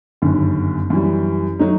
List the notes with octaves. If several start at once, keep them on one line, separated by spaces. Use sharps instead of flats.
G1 F#2 D#3
F#2 E3 G3
F#3 A3 D#4